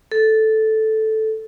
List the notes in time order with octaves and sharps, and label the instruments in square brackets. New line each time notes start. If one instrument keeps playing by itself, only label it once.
[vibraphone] A4